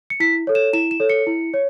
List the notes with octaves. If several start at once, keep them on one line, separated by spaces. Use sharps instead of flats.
C#7
E4 B6
A4 C#5
E7
E4 E7
E7
A4 C#5
C#7
E4
C#5